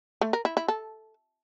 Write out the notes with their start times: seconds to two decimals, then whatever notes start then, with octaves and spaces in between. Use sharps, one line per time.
0.21 A3
0.33 A#4
0.45 E4
0.57 E4
0.68 A4